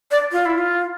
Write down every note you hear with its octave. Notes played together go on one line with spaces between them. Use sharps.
D5
F4
E4
F4